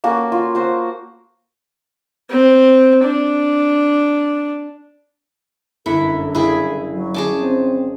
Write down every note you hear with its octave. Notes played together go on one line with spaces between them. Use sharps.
A#3 C#4 F#4 A4
F4
F#4 C5
C4
D4
G1 F#2 E4 A4 C#7
F#1 E4 G#4 G5
F#3
C#4 G#4 A5 D6
C4 D#4